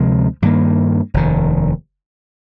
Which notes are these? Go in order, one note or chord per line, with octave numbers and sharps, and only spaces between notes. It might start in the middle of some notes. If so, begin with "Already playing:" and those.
Already playing: D2 C3 F3 G#3
G2 D#3 A#3
F1 D#2 D#3